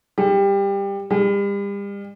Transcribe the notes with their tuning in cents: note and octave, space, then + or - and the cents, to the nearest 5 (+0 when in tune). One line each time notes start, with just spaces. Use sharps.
G3 +20
G3 +40